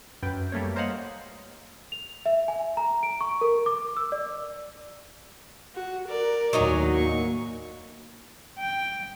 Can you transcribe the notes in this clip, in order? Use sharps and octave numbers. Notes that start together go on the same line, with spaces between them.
F#2 B4 G5
G3 A3 A#3 C#5
A#4 C5 C#5 D#5 F5 F#5
F7
E5
G#5
A#5
D7
C#6
A#4
D6
E6
D5
F#4
A#4 D5
D#2 A2 F#3 D#4 G#5
A#3 C#6
G5